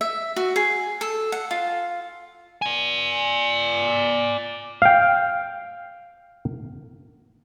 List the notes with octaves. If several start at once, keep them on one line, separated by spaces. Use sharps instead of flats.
E5
F#4
G#4
A4
F#5
F4
D5 G#5
F5 G5